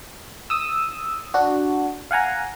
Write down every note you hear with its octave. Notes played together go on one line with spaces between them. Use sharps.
D#6 E6
D4 F#4
F5 F#5 G#5 A#5